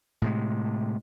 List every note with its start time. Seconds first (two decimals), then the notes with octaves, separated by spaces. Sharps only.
0.22 A2 C3 G#3